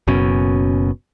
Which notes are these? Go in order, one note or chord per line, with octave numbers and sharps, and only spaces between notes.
F#1 F#2 B2 C#4